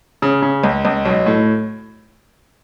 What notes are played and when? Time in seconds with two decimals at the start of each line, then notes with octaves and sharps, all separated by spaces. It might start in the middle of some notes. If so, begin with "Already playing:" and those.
0.22 C#3
0.42 C#3
0.64 C#2
0.85 C#2
1.05 B1
1.26 A2